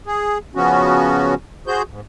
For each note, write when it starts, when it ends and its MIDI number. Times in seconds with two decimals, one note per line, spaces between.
0.06 0.38 68
0.55 1.34 49
0.55 1.34 53
0.55 1.34 59
0.55 1.34 61
0.55 1.34 66
1.67 1.82 66
1.67 1.82 68
1.67 1.82 72
1.67 1.82 91
1.90 2.01 44